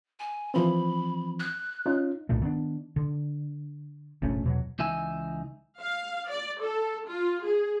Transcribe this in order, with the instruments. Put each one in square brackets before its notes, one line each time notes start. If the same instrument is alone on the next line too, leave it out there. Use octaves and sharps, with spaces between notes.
[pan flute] G#5
[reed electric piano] E3 F3 C4 [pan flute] B5
[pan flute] F#6
[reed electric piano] C#4 D#4 F4
[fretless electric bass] B1 G2 A#2 A3
D#3 B3 D4
D3
F1 A#1 A3 C#4
E2 B2 F#3
[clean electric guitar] C#2 E3 D#4 E5 G#5
[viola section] F5
D5
A4
F4
G#4